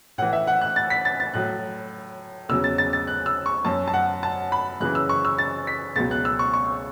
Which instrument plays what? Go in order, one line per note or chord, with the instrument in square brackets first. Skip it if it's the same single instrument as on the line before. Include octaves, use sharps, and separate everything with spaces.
[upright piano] A2 E3 F#5
E5
F#5
F#6
A6
B6
A6
A6
A2 F#3 F#6
E2 C#3 F#3 E6
A6
A6
A6
F#6
E6
C#6
F#2 F#3 A5
A5
F#5
A5
B5
F#2 C#3 E3 F#6
E6
C#6
E6
A6
B6
C#2 B2 F#3 A6
F#6
E6
C#6
C#6